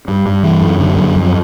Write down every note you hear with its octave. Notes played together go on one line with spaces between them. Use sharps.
G2
G2
E3
F#2
D3
F#2
F2